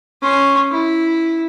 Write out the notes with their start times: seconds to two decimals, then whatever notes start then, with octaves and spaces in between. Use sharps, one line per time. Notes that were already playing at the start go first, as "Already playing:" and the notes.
0.22 C#4 C6
0.71 E4